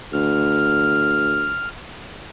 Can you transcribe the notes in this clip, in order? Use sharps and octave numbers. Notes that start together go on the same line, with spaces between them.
D2 F6